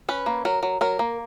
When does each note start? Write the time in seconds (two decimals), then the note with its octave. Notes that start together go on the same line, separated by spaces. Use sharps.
0.09 C#4 B4
0.26 A#3
0.45 F#3 A#4
0.63 F#3
0.81 F#3 A#4
0.99 A#3